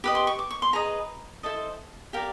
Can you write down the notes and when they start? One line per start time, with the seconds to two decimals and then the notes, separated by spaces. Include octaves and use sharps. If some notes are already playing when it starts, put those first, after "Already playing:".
0.04 G4 B4 D#5 B5
0.15 C6
0.27 C#6
0.39 D6
0.50 C#6
0.62 C6
0.73 G#4 B4 D#5 A#5
1.43 E4 A4 C5 D#5 A5
2.13 G4 A#4 D5 F5